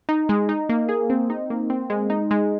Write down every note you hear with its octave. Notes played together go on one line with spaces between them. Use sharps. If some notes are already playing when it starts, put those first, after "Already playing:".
D#4
G#3
D#4
A#3
G#4
C4
D#4
A#3
C4
G#3
D#4
G#3